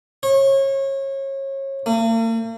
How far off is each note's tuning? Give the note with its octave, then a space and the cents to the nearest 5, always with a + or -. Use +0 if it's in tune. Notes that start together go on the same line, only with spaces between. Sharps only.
C#5 -30
A#3 -45